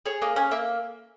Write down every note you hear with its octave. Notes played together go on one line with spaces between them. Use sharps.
G#4 C#5
A#3 D#5
C#4 G#5
A#3 E5